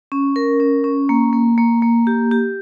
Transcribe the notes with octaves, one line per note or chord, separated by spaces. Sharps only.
C#4
A#4
C#4
C#4
A#3
A#3
A#3
A#3
G4
G4